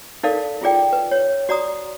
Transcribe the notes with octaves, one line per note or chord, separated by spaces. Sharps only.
D#4 A4 A#4 D5 F5
E4 F4 G#4 D5 G5
B4
C#5
F#4 D5 A#5 D#6